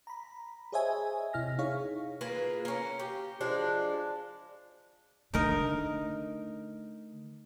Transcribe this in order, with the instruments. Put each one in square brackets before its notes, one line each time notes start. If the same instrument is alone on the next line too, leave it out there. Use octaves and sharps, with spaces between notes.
[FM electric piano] A#5 B5
G#4 C5 C#5 D#5 E5 G#5
C3 E4 F6 A#6
D#4 E4 G#4 C#5 F5 C#6
[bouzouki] A#3 F4 G#4 B4
A#3 C#4
G4
F3 G#3 D4
[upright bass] D3 A3 [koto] D#4 A#4 D#5